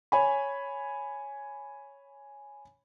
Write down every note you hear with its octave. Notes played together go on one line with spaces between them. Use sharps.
C#5 G#5 B5